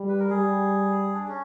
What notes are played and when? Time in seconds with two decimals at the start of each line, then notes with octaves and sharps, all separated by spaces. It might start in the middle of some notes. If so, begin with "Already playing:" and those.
Already playing: G3
0.09 B4
0.19 A#4
0.30 G3 G#4
1.14 D4
1.28 C#4